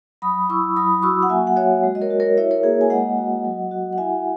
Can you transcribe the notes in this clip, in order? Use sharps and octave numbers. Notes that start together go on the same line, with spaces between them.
F#3 B5 D#6
E4 C#6 E6
F#3 B5 D#6
F#4 C#6 E6
F#5
A#3 E5 G#5
F#5
F#4 C#5 E5
G#3
D#5
A#4 C#5
F#4
A#4 C#5
E4 C#5 E5
A#4 C#5
A#3 G#4
G#5
G#3 D#5 F#5
F#4
F#3
F#4
F#5
E4 E5 G#5